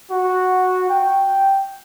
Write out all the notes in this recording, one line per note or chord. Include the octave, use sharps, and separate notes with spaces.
F#4
G5